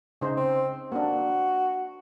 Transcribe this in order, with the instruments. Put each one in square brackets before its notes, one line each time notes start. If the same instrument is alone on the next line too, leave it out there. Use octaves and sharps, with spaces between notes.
[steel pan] C#3 D#4 C5 [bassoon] G#3
[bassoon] C4
[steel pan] A#3 D4 [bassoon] F#4